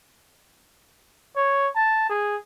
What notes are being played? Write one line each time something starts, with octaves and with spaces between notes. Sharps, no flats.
C#5
A5
G#4